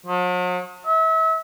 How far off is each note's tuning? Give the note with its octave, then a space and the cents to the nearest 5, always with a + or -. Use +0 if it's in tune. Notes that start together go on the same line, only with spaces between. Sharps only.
F#3 -45
E5 -35